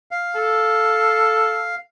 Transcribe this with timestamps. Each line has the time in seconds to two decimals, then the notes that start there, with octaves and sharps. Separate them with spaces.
0.11 F5
0.35 A4